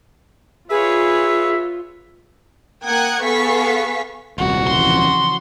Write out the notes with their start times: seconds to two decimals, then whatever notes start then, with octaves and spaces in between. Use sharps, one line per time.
0.70 F4 G#4 B4 C#5 E5
2.84 A#3 F#5 G5 D#6 F#6 G#6
3.23 B3 G#4 A4 F5 C#6 B6
4.38 D#1 C2 F#4
4.67 C#3 E3 F3 C6